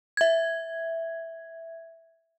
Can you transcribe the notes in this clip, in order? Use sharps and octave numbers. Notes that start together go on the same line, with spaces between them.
E5 G#6